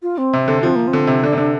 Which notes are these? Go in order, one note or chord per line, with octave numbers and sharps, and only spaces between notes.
F4
C4
C3
D3
F3 C4
A#3
C4
D3
C3
D3 D4
C3
D3 D4